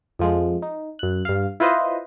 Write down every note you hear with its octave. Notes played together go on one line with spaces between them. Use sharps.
F2 F3 G#3
D#4
F#2 F#6
G2 F5
E4 F4 B4 C5 D#5